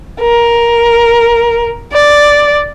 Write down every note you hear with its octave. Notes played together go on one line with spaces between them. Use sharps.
A#4
D5